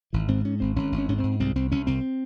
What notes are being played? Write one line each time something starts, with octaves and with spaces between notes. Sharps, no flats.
G#1 E3
G#2 C4
G#2 C#4
G#1 C4
G#1 C#4
G#1
C#4
G#2 C#4
C4
G#2
C2 C4
C2 C4
C2 C#4
C2 C4